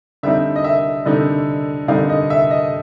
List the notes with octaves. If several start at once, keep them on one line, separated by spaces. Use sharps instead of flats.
D3 G3 C4 D#4 E5
D#5
E5
D3 G3 C4 D#4
D3 G3 C4 D#4 F5
D#5
E5
D#5